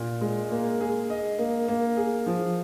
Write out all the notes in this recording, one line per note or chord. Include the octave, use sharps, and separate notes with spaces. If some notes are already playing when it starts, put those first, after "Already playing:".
Already playing: A#2
G#3
A#3
G#4
D#5
A#3
A#3
G#4
F3